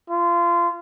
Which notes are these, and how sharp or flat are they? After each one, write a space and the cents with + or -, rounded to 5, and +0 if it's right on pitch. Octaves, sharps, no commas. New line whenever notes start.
F4 -25